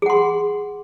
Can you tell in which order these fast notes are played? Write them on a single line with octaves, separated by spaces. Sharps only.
G#4 F#5 C6